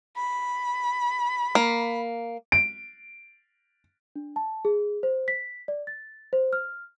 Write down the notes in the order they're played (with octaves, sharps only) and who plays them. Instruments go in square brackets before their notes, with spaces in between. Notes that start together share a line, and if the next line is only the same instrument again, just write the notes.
[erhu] B5
[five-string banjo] A#3
[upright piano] D7
[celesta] D4
A5
G#4
C5
B6
D5
A6
C5
F6